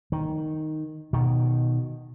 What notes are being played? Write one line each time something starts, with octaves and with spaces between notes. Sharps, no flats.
D#3
B2 D#3